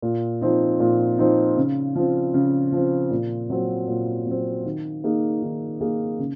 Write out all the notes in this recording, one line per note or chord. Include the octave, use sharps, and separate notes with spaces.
A#2
F3 C4 D#4
A#2
F3 C4 D#4
C#3
F3 C4
C#3
F3 C4
A#2
F#3 C4
A#2
F#3 C4
D#3
A#3 D#4 G#4
D#3
A#3 D#4 G#4
C#3